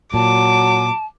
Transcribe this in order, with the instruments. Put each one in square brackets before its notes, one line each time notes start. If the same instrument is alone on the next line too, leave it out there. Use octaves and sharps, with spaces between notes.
[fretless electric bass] A#2 [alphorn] F#3 [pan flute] A5 [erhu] D6